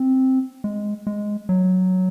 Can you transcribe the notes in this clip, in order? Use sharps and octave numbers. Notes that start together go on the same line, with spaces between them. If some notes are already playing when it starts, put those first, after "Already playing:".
Already playing: C4
G#3
G#3
F#3